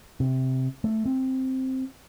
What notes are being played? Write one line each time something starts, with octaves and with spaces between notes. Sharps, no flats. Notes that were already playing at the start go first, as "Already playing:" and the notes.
C3
A3
C4